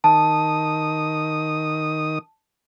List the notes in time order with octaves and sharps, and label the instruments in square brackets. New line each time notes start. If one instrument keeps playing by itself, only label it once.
[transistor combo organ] D#3 D#6 [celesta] A5